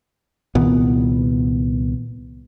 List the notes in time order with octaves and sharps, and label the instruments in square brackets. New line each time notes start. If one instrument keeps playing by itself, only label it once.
[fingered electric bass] C2 A#2 D#3 B3